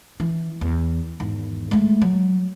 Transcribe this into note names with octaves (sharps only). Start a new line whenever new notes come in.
E3
E2
G#1 E2
G#3 A3
F#3